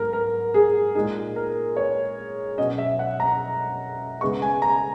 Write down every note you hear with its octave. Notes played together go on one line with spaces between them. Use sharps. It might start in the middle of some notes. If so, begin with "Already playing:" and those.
Already playing: G#2 F#3 B3 A#4
A#4
G#4
A#2 G#3 D#4 G#4
A#4
C#5
B2 F#3 C#4 D#5
E5
F#5
A#5
C#3 G#3 B3 C#6
G#5
A#5